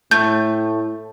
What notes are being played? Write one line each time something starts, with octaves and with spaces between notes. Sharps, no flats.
A2 A3 G6